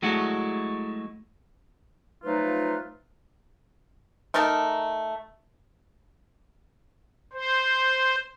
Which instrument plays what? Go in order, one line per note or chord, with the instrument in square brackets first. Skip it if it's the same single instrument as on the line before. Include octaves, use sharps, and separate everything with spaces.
[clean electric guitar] F#3 G#3 A3 E4 F#4
[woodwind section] F3 F#3 A3 D#4 F4 B4
[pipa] A3 D#4 A#4 A5
[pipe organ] C5